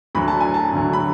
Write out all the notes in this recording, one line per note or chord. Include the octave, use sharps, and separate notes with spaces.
D2 D3 F#3 B5
A5
G#5
A5
D2 D3 F#3
B5